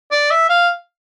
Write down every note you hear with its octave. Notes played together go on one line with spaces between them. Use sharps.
D5
E5
F5